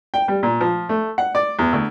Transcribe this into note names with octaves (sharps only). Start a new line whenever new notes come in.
G5
G3
A#2
F3
A3
F#5
D5
E2
D2